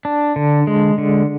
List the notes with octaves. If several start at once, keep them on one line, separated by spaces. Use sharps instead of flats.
D4
D3
G#3
D3